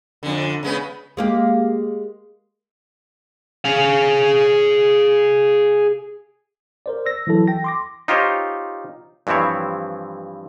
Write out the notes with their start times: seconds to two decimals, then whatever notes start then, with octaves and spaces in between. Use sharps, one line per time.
0.23 F2 D3
0.63 C#3 G#3 B3
1.17 G#3 A#3 G4
3.65 G#4 F5
6.86 A#4 C5 D5
7.06 E6 A#6
7.27 E3 F#3 E4 A4
7.48 G5 A#6
7.64 C6 D6 A#6
8.08 D#4 F4 G4 C5 C#5
9.27 G2 E3 F3 C4 E4 C#5